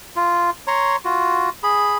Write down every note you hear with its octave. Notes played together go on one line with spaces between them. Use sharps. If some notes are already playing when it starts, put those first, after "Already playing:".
F4
C#5 A#5 C6 C#6
F4 F#4
G#4 B5